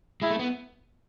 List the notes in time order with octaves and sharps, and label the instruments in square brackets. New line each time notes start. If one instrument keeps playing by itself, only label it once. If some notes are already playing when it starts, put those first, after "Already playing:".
[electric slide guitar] G#3 [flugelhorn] E4
[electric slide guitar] A3
B3